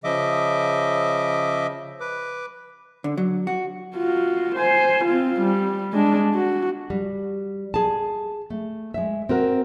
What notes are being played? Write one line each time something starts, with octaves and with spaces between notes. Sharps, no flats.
C#3 F3 D#5 E5 D6
B4 D6
D3
F#3
F#4
F4 F#4
C5 G#5
C4 F4
G3
G#3 D4
F#4
G3
G#4 A5
A3
G#3 E5
C4 F#4 A#4